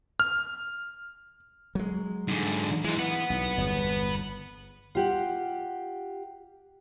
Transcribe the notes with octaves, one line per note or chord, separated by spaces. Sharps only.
F6
F#3 G#3
G#2 D3
E3 G#3 D#4
B4 F#5
B1
G1 E2
F4 G4 F#5